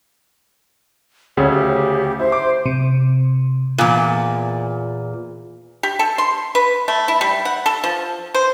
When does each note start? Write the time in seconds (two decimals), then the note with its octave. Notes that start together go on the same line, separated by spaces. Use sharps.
1.37 D2 C#3 C#5
1.51 G4
2.19 E4 C5
2.32 D6
2.66 C3
3.78 E2 A#2
5.83 G4
5.99 A4
6.18 C6
6.55 B4
6.88 A3
7.08 E4
7.21 G3
7.45 F#5
7.66 A4
7.84 F3
8.35 C5